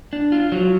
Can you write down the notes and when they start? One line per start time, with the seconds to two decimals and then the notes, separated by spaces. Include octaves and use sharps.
0.13 D4
0.32 F4
0.52 F#3